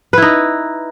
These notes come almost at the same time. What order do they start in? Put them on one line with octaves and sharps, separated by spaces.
B4 E4 D#4